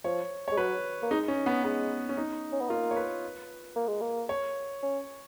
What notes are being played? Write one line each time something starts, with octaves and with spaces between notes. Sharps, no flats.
F3 C#5
G#3 C#5
F#3 B4
A#3
G#3 D#4
C#4
B3
G#3 B3
C#4
D#4
C#4
B3
A#3 F4
C#5
B4
A#3
G#3
A#3
C#5
C#4